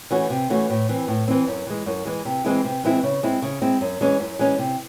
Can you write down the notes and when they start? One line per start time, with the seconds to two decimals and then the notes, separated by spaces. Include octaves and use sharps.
0.11 E3 A3 C#4 F#4
0.30 C3
0.50 E3 A3 C#4 F#4
0.70 A2
0.89 E3 C4
1.08 A2
1.28 E3 C4
1.48 F#2
1.67 E3 G#3
1.86 F#2
2.06 E3 G#3
2.25 C3
2.44 E3 G#3 C4 E4
2.64 C3
2.84 E3 G#3 C4 E4
3.03 C#3
3.23 G#3 C4 E4
3.42 C#3
3.62 G#3 C4 E4
3.81 F#2
4.01 E3 G#3 C#4
4.20 F#2
4.39 E3 G#3 C#4
4.58 C3